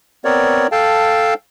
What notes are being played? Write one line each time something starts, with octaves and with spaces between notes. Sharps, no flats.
B3 C4 A#4 C#5 D5
A4 F5 G5 A5